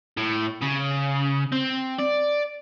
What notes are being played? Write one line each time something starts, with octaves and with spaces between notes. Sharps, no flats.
A2
C#3
C4
D5